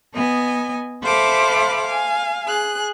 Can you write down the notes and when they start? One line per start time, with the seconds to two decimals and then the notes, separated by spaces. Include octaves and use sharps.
0.15 B3 D#5 G#5
1.04 A4 C5 E5 F5 B5 D6
1.84 F5 G#5
2.46 G#4 F#6